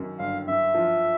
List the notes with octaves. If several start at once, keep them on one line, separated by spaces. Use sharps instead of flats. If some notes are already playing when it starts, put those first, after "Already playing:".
Already playing: F#2 D#3
G1 F5
F#2 E5
F3